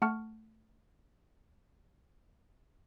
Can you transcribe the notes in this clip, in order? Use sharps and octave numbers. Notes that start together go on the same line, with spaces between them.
A3 F#5 A5 C#6 F6